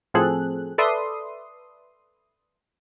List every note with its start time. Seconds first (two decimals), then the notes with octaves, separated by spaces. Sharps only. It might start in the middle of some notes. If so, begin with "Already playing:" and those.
0.14 A2 F3 C4 G#4 A4 F#6
0.78 A4 B4 D5 E5 C6 D#6